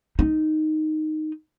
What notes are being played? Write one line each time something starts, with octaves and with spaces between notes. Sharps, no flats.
D#4